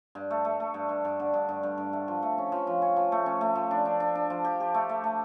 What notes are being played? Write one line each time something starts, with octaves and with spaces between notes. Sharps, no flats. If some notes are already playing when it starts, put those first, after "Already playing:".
G2
A3
A3
A3
G2
G2
G2
D3
G2
G2
G2
G2
A3
F3
A3
C#4
F3
F3
C#4
F3
A3
C#4
A3
F3
D4
D4
D4
D4
F3
G4
G4
A3
A3
A3